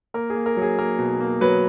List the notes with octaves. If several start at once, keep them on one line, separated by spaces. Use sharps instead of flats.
A#3 A#4
G#4
A#3
A#4
F#3 G#4
A#3 A#4
B2
A#3
F#3 B4